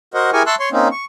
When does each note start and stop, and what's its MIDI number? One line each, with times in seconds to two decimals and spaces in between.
0.14 0.30 66
0.14 0.30 70
0.14 0.30 72
0.14 0.30 75
0.14 0.30 78
0.33 0.43 64
0.33 0.43 67
0.33 0.43 68
0.33 0.43 70
0.33 0.43 80
0.33 0.43 85
0.46 0.55 76
0.46 0.55 81
0.46 0.55 84
0.46 0.55 85
0.46 0.55 88
0.46 0.55 90
0.60 0.69 73
0.60 0.69 84
0.60 0.69 85
0.72 0.88 58
0.72 0.88 60
0.72 0.88 61
0.72 0.88 63
0.91 1.05 85